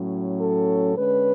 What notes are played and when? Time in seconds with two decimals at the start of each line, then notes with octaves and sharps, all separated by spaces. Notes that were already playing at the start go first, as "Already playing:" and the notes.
Already playing: A2 F#3 C#4
0.40 A4
0.97 D3 G#3 C#4 B4